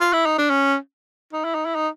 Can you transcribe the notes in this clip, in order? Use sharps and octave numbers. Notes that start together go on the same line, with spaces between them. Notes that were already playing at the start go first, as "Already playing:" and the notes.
F4
E4
D#4
D4
C#4
D#4
E4
D#4
E4
D#4